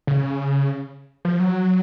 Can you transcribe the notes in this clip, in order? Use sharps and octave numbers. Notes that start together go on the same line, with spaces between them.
C#3
F3
F#3